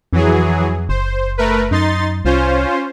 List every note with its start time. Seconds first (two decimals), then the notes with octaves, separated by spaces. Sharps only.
0.13 F2 E3 F#3 G#4
0.89 F#1 C5
1.38 A3 A#4 B4
1.71 F#2 D#4 C6 A6
2.25 C2 C#4 F4 C5